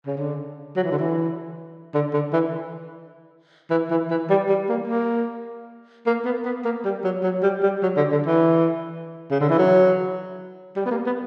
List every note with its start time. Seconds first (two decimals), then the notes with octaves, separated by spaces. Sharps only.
0.07 C#3
0.17 D3
0.77 F#3
0.83 E3
0.91 D3
0.99 E3
1.95 D3
2.13 D3
2.33 E3
3.70 E3
3.91 E3
4.10 E3
4.30 G3
4.49 G3
4.69 A#3
4.88 A#3
6.06 A#3
6.25 B3
6.45 B3
6.65 A#3
6.85 G3
7.04 F#3
7.23 F#3
7.43 G3
7.63 G3
7.83 F#3
7.97 D3
8.12 D3
8.27 E3
9.31 C#3
9.40 D3
9.50 E3
9.59 F#3
10.76 G3
10.86 B3
10.91 A#3
11.06 B3